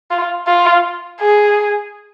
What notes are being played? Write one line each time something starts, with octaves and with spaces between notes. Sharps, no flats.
F4
F4
G#4